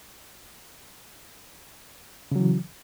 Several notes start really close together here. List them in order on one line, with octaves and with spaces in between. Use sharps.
C#3 F#3 E3